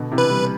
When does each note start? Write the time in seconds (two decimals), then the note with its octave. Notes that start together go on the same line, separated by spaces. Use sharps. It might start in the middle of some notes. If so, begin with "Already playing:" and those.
Already playing: B2 D3
0.12 C3 E3
0.18 B4
0.31 E3 G3